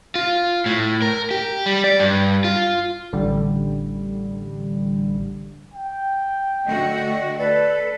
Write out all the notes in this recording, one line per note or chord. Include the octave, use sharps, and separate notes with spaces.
F4
A2
A#4
G4
G3
D5
G2
F4
A1 D3 G3
G5
D3 A3 F#4 D#5
A4 B4 D5